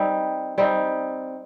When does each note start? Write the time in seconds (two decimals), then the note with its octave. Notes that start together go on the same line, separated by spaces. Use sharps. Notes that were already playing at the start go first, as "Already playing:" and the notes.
Already playing: G3 C4 D#4
0.58 G3 C4 D#4